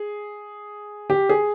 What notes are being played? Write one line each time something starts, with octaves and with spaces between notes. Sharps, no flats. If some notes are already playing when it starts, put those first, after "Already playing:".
Already playing: G#4
G4
G#4